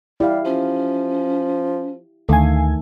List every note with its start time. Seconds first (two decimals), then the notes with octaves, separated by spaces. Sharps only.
0.20 G3 E4 G4 F5
0.45 F3 C#4
2.29 D2 D#3 A3 A4 F5 G#5